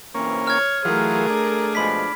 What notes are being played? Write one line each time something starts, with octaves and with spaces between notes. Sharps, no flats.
B1 E3 A#3 C4 C#4
C#5 F6 G#6
E3 F#3 A3 F4 G#4 A#4
D4
B2 F3 G#3 B5 B6